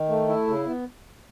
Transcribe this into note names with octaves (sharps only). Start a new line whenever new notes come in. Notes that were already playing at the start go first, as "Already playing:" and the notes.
Already playing: D#3
A3
E4
C#3
B3